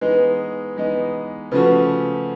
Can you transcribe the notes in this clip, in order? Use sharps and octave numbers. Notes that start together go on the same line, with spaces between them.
E3 G#3 B3 D#4 B4
E3 G#3 B3 D#4
C#3 F3 A3 C#4 F#4 B4